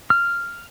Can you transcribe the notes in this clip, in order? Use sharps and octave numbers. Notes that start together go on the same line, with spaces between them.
F6